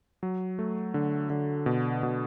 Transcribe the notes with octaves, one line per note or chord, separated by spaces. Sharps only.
F#3
A3
D3
D3
B2
B2